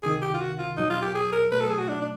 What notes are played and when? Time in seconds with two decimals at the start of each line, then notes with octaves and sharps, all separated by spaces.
0.03 C#2 C3 D#3 G#4
0.22 G4
0.34 F4
0.40 F#4
0.59 F4
0.77 E2 B2 F#3 D#4
0.90 F4
1.02 G4
1.15 G#4
1.32 A#4
1.51 B2 F#3 A3 B4
1.60 A4
1.70 G#4
1.79 F#4
1.88 D4
2.01 D4